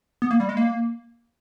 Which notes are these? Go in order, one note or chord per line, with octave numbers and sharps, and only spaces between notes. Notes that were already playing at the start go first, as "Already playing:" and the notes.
B3
A#3
G3
G#3
A#3